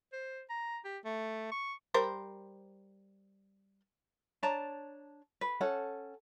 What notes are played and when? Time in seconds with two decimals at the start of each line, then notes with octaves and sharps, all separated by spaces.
0.13 C5
0.49 A#5
0.85 G4
1.05 A3
1.52 C#6
1.94 G3 A#4 C5
4.43 D4 C#5 A5 A#5
5.41 B4
5.61 C#4 A4 F#5 A5